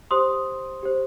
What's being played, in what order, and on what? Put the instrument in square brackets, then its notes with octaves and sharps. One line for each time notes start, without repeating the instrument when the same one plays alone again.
[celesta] G4 C5 C6 D#6
G4 C5